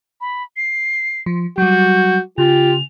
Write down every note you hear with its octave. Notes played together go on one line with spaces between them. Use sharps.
B5
C7
F3
F#3 G3 F#4 G6
C#3 F4 G4 F7